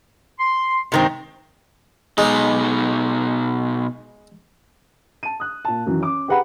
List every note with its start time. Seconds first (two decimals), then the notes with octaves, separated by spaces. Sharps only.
0.39 C6
0.92 G2 C3 D#3 G#3 C4
2.18 B2 G#3 D#4
5.23 A5 D#7
5.40 D#6 F#6
5.65 A#2 A5
5.86 F#2 D#3 E3 F#3
6.00 C#4 D6
6.28 G4 G#4 B4 F#5 A#5 B5